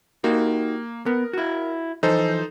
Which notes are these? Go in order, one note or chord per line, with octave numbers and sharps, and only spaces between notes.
A#3 D#4 F#4 G4
B3 A#4
E4 F#4
E3 F3 D#4 A4 C5